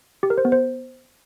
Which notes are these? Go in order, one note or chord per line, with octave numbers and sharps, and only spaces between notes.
G4
A#4
C5
B3
C5